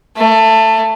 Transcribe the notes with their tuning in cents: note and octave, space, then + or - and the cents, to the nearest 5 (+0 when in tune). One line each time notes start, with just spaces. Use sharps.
A3 +15